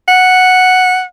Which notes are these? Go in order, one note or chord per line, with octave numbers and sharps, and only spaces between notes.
F#5